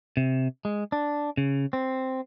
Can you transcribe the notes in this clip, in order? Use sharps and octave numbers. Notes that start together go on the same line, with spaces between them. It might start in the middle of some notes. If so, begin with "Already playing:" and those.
C3
G#3
D4
C#3
C4